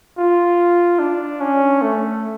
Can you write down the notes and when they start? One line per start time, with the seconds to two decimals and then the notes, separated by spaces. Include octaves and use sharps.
0.18 F4
0.99 D4
1.41 C#4
1.82 A3